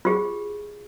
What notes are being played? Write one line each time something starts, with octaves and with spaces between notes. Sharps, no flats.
F4 G4 G#4